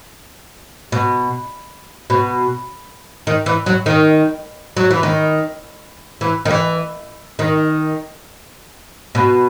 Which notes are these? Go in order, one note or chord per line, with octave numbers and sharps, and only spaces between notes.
B2
B2
D#3
E3
F#3
D#3
F#3
E3
D#3
E3
D#3
E3
D#3
B2